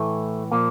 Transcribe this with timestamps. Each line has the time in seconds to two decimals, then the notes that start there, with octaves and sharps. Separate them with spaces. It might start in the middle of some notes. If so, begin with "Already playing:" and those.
Already playing: A2 E3 A3
0.52 A#2 F3 A#3